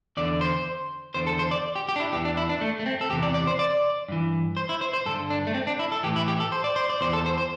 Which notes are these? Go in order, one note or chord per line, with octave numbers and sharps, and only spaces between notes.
E2 D3 D5
C5
E2 D3 C5
A4
C5
D5
G4
G4
D4
E4
E2 E3 G4
D4
E4
D4
A3
A3
C4
A4
E2 C3 E3 G4
D5
D5
C5
D5
G2 E3
C5
E4
C5
C5
G2 D3 A4
D4
A3
C4
D4
E4
A4
A2 E3 G4
E4
G4
A4
C5
D5
C5
D5
E2 E3 C5
A4
C5
C5